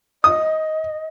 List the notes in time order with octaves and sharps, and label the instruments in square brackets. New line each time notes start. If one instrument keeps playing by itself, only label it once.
[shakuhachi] D#5 [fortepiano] D#6